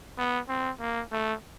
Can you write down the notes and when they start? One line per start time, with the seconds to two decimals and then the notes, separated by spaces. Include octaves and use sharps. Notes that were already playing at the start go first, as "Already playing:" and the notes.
0.18 B3
0.49 C4
0.80 A#3
1.12 A3